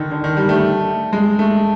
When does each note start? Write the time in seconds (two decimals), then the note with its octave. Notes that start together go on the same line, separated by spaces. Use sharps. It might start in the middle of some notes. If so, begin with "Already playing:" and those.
Already playing: D3 D#3
0.11 D3
0.24 D#3
0.37 G3
0.49 A3
1.13 G#3
1.39 A3